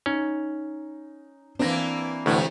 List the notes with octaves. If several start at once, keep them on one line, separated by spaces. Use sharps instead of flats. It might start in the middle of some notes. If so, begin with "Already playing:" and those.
C#4 D#4
E3 A#3 C4 D4 A#6
D2 A2 C3 E3 A3